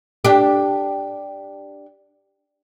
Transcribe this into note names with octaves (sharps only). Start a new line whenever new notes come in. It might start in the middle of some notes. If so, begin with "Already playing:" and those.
D4 G4